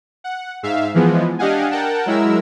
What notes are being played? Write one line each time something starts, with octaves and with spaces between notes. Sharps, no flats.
F#5
G#2 E5 F5
E3 F3 G#3 B3
D4 G4 D#5 F5 F#5 G#5
A#4 F#5 G5 A5
F#3 G#3 E4 A#4 E6